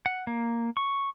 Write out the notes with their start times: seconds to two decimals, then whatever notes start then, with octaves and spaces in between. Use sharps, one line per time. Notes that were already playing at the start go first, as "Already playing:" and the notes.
0.06 F#5
0.27 A#3
0.77 C#6